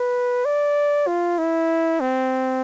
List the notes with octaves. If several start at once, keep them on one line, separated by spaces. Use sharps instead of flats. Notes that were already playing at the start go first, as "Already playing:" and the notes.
Already playing: B4
D5
F4
E4
C4